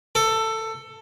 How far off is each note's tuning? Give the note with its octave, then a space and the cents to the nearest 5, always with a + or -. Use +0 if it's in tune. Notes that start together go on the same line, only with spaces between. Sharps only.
A4 +15